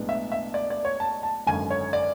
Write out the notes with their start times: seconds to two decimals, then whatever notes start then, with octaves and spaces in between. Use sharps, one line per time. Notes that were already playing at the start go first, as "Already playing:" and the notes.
Already playing: B1 A2 G#3 B3 D4
0.09 E5
0.32 E5
0.54 D5
0.70 D5
0.85 C#5
1.00 A5
1.23 A5
1.47 G#1 F#2 D3 G#5
1.70 C#5
1.93 D5